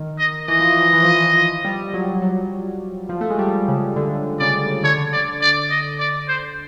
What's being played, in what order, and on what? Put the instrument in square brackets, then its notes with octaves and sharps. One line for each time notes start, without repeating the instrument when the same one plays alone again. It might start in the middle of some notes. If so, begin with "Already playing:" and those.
Already playing: [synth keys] D#3
[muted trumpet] D#5
[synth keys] E3 [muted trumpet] D#5
[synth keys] F3
E3
F3
E3
F3
E3
F3
G3
F#3
F#3
F3
A3
G#3
G3
C#3
D3
[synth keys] C#3 [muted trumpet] D5
[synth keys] D3 [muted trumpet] C#5
[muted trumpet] D5
D5
D#5
D5
C5